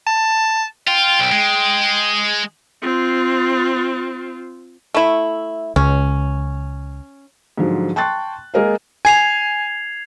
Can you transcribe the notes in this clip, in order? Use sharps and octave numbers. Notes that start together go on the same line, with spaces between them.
A5
F4 G5
B1
G#3
C4 F4
A3 E4
C#2 C#4
G#2 D3 F3 F#3
G5 A5 C6 C#6 F#6 A6
G#3 A#3 G#4 A#4 D#5 F5
G#5 G#6 C7 F7